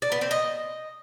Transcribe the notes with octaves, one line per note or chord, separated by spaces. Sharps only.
D5
B3
C4
D#5